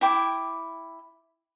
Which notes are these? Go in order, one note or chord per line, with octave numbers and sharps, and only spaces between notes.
E4 G5 D6